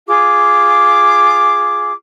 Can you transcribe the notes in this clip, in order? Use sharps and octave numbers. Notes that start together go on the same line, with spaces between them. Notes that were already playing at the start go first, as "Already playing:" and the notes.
F4 G#4 D6